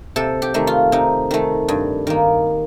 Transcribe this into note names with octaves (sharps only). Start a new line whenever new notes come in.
C3 A4
G4
D#3 A3
F4
C3 D#4
D#3 A3
G2
D#3 A#3